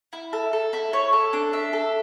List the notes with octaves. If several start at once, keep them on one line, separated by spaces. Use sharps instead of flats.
E4
A4
A4
E4
C#5
A4
D4
E5
A4